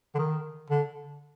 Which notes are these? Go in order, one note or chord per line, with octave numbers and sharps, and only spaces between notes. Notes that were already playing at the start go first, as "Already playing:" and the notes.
D3
D#3
D3